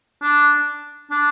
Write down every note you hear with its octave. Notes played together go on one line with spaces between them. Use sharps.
D4
D4